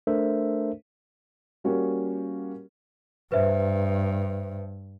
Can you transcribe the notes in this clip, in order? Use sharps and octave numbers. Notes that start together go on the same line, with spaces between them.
A3 D4 A4 A#4 C5 E5
G3 A#3 C#4 F#4 G4
G2 B4 C5 E5